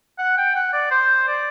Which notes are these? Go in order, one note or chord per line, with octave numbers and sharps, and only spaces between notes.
F#5
G5
F#5
D5
C5
D5